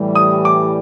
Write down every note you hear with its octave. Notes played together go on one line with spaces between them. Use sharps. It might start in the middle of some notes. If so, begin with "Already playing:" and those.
Already playing: A2 E3 G3
D#6
D6